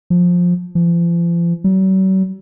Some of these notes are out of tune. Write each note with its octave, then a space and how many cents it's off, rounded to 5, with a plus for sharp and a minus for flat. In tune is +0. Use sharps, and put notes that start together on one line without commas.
F3 +15
F3 -40
F#3 +45